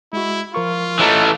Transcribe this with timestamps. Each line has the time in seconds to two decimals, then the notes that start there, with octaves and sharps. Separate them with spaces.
0.13 G#3 E4 F#4
0.54 F3 F4 A#4 C#6
0.99 E3 A3 C#5 D#5 A#5